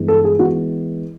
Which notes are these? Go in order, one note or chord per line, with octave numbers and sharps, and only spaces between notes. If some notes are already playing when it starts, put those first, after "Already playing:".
Already playing: G2 E3 G#3 B3
A4
G#4
E3 G#3 B3 F#4